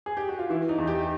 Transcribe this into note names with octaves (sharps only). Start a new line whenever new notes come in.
G#4
G4
F#4
F4
E3 E4
D#4
E2
G4